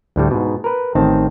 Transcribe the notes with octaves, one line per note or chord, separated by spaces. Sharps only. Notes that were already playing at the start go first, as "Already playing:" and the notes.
D2 A2 G3
G#2 B2
A#4 B4
A1 D#3 C4 A5